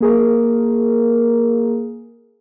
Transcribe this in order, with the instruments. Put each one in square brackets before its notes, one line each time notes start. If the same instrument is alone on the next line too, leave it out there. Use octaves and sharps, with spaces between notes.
[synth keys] A#3 G#4 A#4